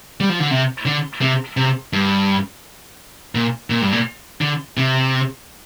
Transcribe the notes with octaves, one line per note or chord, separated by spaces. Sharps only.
G3
F3
D3
C3
D3
C3
C3
G2
A#2
A#2
G2
A#2
D3
C3